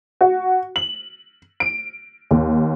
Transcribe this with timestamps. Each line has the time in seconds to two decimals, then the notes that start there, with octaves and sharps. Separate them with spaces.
0.21 F#4
0.76 F#7
1.60 D7
2.31 D#2